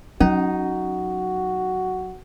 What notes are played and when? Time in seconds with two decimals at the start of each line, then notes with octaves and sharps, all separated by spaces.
0.20 F#3 C#4 D#4 F#4